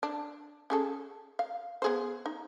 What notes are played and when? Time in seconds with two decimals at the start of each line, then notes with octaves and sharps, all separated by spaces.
0.03 D4
0.70 C#4 G#4 A4
1.39 F5
1.82 B3 G#4 C5
2.26 D#4